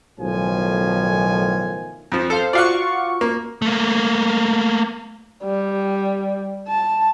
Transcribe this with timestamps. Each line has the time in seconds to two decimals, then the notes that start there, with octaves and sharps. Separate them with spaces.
0.19 B1 A2 D#3 F3 G#5
2.12 F2 F3
2.30 A4 C5 F5
2.53 F4 F#4 D5 F5 C#6 F#6
3.21 A#3
3.62 A3 A#3
5.44 G3
6.68 A5